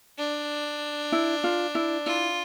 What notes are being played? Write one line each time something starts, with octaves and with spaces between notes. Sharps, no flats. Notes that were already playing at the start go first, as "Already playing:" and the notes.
D4
E4
F4
E4
E4 F4